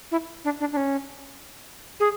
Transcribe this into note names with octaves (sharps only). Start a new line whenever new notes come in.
E4
D4
D4
D4
C#4
G#4